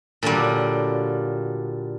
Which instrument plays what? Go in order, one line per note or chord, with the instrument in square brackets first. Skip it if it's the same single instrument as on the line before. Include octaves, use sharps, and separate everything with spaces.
[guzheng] A#2 D3 F#3 G3